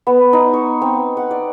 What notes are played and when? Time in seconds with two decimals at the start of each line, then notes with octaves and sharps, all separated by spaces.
0.07 B3
0.33 D#4
0.54 C#6
0.82 C4
1.17 F#5
1.31 D5